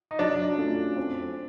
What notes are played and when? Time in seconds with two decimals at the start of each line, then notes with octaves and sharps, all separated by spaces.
0.11 D#4
0.19 F#3 D4
0.58 A3 C#4 F4
0.97 C4